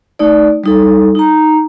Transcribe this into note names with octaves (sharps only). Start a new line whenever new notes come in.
A3 D#4 D5
G3 D#4 A4
D#4 A#5